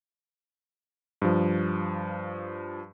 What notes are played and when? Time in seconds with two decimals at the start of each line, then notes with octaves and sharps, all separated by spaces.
1.22 G2 F3